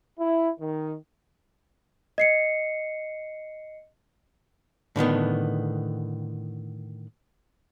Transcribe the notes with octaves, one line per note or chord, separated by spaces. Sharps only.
E4
D#3
D#5 C7 C#7
A2 D3 D#3 B3